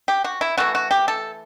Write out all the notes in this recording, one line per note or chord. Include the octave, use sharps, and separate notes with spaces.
G4
F#4
E4
E3 A3 F#4
F#4
G4
A4